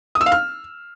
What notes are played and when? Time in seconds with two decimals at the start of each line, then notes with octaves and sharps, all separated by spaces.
0.15 D#6
0.21 E6
0.26 F5
0.32 F6